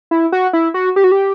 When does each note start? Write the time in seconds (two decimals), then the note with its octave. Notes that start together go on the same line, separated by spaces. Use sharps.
0.11 E4
0.32 F#4
0.53 E4
0.74 F#4
0.96 G4
1.04 F#4
1.11 G4